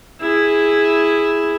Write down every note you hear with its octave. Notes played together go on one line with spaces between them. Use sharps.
E4 G#4